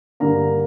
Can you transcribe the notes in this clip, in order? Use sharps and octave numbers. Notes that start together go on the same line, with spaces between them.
G2 D3 A#3 A#5